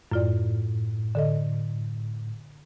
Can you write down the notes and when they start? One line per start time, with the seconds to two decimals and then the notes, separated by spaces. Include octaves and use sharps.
0.12 F#2 A2 F4 D5
1.15 D3 A4 D#5